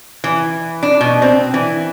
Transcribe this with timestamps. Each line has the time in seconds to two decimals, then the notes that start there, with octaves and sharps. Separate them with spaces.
0.24 E3
0.83 D4
1.01 B2
1.22 C4
1.54 E3